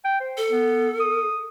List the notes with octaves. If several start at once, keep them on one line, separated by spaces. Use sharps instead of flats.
G5
C5
A4
B3
D#6